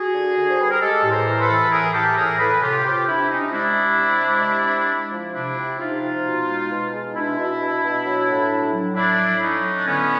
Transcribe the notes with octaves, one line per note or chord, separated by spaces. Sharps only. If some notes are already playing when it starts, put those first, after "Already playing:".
Already playing: F#4 G#4
D3
D3
C5
G3 B4
A#4
G#3 G4 A4
A2
A#4 C5
E3
A4 B4
E3
A2 G#4 A#4
E3 G4 A4
B4
A2 G#4 A#4
A2 A4 B4
C3 F4 G4
C3 F4 G4
C3 D4 E4
C3 C#4 D#4
G#3 D4 E4
C3
C3
G#3
C3
C3
G#3
F3
C3 D4 E4
C3
C3 D#4 F4
F3
B2
G#3
B2
G#3
B2 D4 E4
B2
B2
B2
F#3
A2
F#3
F#3
A2 D4 E4
F#3
F#3 C#4 D#4
A2
D4
D3 B3 C#4